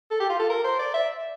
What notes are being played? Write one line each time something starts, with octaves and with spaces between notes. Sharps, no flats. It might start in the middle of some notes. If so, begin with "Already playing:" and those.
A4
G4
F4
A4
A#4
C5
D5
E5